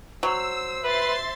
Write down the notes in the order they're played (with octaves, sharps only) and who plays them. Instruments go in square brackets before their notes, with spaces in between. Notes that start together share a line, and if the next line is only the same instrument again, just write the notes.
[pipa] F#3 [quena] C5 [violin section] E6
[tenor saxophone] B4 [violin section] E5 C6 A6